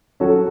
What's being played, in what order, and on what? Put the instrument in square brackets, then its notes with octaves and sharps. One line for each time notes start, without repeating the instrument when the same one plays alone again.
[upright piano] F#3 C#4 F#4 A4